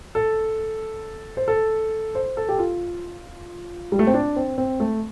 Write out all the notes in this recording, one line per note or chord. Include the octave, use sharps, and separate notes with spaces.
A4
C5
A4
C5
A4
G4
F4
G3
A3
C4
D4
C4
C4
A3